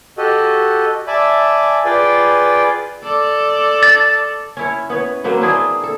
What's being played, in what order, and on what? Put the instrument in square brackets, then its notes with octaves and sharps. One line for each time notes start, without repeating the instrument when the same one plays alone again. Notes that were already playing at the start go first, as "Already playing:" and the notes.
[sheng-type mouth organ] F#4 G4 A4 D#5
D5 E5 G#5 A5 B5
F4 G#4 B4 D5 G5
[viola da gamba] A4 D5
[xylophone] A6
[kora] C#4 E4 C#5
B3 B4 C#5
F#3 A#3 C4 B4
C4 D4 E4 G#4
A4